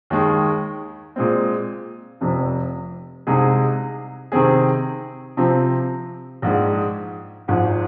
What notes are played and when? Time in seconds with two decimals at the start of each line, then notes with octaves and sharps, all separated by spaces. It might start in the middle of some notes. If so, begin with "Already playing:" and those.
0.10 D#2 D#3 G#3
1.16 A#2 G#3 C4
2.21 F1 F2 C3
3.27 C2 C3 G#3 D#4 G#4
4.32 C3 D#3 C4 G#4
5.37 C3 F3 C4
6.42 A#1 G#2 G#3
7.48 G#1 G#2 F3